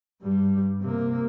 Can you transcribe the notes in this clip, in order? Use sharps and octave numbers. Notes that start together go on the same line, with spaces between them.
G2 G3
C3 A#3